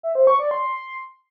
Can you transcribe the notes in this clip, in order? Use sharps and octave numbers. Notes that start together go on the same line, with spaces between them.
E5
C5
C#6
D5
C6